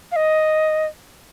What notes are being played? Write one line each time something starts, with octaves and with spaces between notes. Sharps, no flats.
F5
D#5